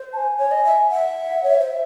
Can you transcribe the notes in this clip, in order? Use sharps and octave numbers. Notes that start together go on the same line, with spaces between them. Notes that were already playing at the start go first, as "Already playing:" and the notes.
Already playing: C5
A5
G#5
C#5
D#5
E5
E5 F#5
C#5
C5